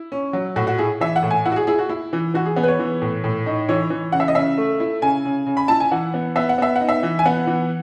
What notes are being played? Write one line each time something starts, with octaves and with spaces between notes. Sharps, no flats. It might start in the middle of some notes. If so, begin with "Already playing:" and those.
Already playing: E4
C#4
F#3
A2 F#4
F#4
E4 G#4
E3 E5
F#5
A2
G#5
E4 F#5
F#4
G#4
E4 G#4
F#4
E4
E3
E3 F#4
G#4
B3 G#4
B4
C#5
E3
A2
A2
D#4
E3 C#5
E3
C#3 F#5
E5
D#5
C#3 E5
A3
E4
C#3 G#5
C#3
C#3
B5
E4 A5
G#5
E3 F#5
B3
B3 E5
F#5
B3 E5
F#5
D#4
E5
E3
G#5
B3 F#5
E3